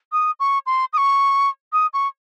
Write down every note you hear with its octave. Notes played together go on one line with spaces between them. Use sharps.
D#6
C#6
C6
D#6
C#6
D#6
C#6